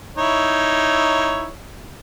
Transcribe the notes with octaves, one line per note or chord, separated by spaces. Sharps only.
D#4 E4 C#5